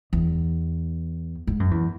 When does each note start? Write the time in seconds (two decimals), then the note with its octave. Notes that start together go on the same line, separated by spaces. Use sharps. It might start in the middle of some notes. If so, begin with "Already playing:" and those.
0.13 E2
1.47 G#2
1.60 F#2
1.71 E2